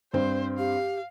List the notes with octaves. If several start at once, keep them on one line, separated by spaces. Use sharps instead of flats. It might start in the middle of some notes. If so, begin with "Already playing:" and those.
G2 C4 C5
G4 F5